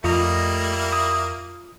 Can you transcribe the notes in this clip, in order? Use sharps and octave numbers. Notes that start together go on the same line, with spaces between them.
F2 G3 A3 A#3 E4 F4 D#5 A#5
D#6